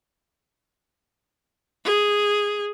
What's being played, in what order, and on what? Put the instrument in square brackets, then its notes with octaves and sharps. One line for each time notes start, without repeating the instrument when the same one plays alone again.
[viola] G#4